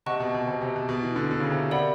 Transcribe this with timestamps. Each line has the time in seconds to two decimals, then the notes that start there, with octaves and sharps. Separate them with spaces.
0.06 C3 D#5 F#5 A5 C#6 F#6
0.20 B2
0.34 B2
0.47 C3
0.61 C3
0.76 B2
0.89 B2
1.03 E3
1.16 D3
1.31 D3
1.40 C#3
1.51 C3
1.71 C3 A#4 D5 F#5 B5